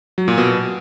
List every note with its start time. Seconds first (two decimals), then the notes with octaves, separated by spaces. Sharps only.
0.18 F#3
0.28 A#2
0.38 B2